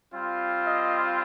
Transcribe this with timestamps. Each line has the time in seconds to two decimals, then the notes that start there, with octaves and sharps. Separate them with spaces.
0.13 G3 C4 F4
0.64 D#5